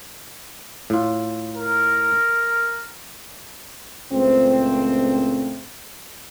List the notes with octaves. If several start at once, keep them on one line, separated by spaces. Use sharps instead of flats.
A2 F4
A#4
C#2 A#2 C#3 A3 C4